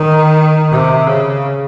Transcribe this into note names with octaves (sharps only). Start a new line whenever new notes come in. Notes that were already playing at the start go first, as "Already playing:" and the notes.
Already playing: D#3
C3
C#3